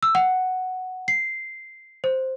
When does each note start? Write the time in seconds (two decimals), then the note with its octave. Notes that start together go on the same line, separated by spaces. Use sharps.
0.03 E6
0.15 F#5
1.08 C7
2.04 C5